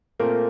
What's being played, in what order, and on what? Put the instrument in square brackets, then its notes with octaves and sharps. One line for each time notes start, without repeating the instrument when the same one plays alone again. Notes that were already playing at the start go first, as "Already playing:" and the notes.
[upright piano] A#2 A3 A#3 C4 A#4